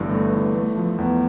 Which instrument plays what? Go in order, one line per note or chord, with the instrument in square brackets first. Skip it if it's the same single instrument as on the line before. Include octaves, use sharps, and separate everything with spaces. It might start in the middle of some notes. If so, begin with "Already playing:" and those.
Already playing: [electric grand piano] G1 G2 E3 A3
A3
E3
A3
F3
E2